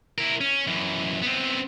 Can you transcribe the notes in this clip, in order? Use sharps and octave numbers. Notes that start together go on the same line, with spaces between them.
E4 A#4
C#4
F#2 E3
B3 C4